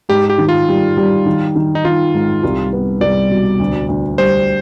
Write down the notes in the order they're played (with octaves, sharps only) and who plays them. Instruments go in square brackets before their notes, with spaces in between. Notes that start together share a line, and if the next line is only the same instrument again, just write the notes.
[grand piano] G#2 [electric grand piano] G4
[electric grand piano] G4
[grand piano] D#3
[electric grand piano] F4
[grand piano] G3
G3
D#3
D#3
[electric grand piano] D#4
[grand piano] D#3 [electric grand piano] F4
[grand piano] G#2
C2
B3
[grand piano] C2 [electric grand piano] D5
[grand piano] B2
D2
D2
[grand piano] G3 [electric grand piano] C5